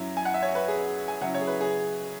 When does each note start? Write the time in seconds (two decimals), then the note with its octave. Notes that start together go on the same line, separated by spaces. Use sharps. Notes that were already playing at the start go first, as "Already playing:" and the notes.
Already playing: F#2 F#3 E4
0.17 G#5
0.25 F#5
0.34 E5
0.42 C#5
0.55 B4
0.68 G#4
1.08 G#5
1.21 C#3 F#3 E4 F#5
1.34 C#5
1.41 G#4
1.47 B4
1.61 G#4